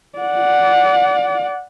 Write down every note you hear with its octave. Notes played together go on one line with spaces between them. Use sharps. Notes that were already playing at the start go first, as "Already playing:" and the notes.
D5 F#5